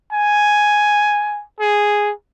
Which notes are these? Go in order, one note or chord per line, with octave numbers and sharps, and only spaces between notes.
G#5
G#4